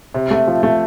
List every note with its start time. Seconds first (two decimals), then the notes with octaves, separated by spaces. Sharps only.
0.14 C3
0.31 A3
0.47 F3
0.63 A3